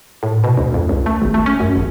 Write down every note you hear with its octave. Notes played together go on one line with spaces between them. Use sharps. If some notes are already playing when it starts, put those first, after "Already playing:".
A2
B2
D2
F2
C#2
A3
G#1
A3
C#4
F#2
G#1